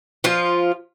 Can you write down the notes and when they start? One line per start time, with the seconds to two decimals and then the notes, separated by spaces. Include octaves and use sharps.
0.24 F3 F4